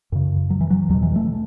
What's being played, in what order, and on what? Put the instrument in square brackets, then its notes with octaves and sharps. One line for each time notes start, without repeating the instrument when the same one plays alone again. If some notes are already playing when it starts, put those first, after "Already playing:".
[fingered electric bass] F#2 C#3
F#3
E3
F#3
E2 F#3
B2
E3
A3